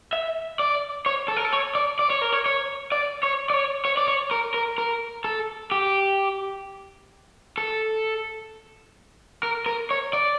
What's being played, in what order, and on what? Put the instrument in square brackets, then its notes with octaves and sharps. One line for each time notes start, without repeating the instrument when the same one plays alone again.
[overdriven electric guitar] E5
D5
C#5
A4
A#4
A4
C#5
D5
D5
C#5
A#4
C#5
C#5
D5
C#5
D5
C#5
C#5
D5
C#5
A#4
A#4
A#4
A4
G4
A4
A#4
A#4
C#5
D5